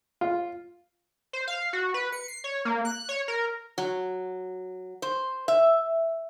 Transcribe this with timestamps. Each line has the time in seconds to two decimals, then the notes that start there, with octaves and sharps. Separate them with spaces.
0.21 F4
1.33 C5
1.48 F5
1.73 F#4
1.94 B4
2.12 C#7
2.28 C7
2.44 C#5
2.65 A#3
2.85 F#6
3.09 C#5
3.28 A#4
3.78 F#3
5.02 C5
5.48 E5